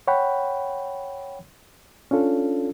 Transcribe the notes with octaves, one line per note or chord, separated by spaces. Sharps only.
C#5 F#5 G5 B5
C#4 D4 F4 A4